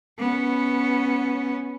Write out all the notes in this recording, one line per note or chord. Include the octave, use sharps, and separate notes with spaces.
B3 C#4